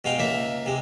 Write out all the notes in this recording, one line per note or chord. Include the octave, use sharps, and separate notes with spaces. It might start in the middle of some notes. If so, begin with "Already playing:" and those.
B2 G#3 F5 G5
C#2 A#3 E5
C3 G#3